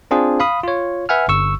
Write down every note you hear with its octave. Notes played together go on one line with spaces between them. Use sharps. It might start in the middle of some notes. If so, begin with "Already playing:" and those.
C4 D4 F4 G#4 C5
F5 B5 D#6
F4 C#5
B4 E5 F#5 G#5 F6
G1 C#6 E6